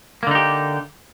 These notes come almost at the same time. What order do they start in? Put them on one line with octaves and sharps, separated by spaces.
A#3 D3 D#4 G4